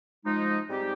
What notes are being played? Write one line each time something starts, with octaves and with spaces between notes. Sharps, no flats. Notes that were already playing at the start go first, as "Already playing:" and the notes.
F3 G#3 D#4
G#2 G3 C4 D#4 G4